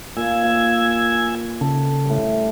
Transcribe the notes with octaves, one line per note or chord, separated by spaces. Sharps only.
A#2 G#5 E6 G#6
F5
C#3 A4
A2 G3